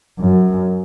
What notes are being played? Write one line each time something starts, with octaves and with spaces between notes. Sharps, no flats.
F#2